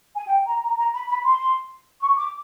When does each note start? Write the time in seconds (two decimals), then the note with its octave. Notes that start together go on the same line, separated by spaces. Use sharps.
0.16 G#5
0.27 G5
0.47 A#5
0.63 A#5
0.78 A#5
0.94 B5
1.08 B5
1.24 C6
2.01 C#6
2.16 D6